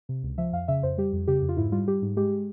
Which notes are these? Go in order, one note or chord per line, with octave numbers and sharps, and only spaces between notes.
C3
C#2
F3 E5
F2 F5
C#3 E5
F2 C5
G3 G4
F2
C#3 G4
F2
F4
G#2 E4
G3 F4
G3 G4
G#2
G#3 G4